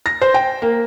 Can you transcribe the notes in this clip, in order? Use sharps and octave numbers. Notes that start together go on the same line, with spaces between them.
A#6
C5
G5
A#3